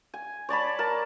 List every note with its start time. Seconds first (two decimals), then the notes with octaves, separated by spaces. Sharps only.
0.14 G#5
0.49 C#5 D5 A5 B5
0.79 A#4 A5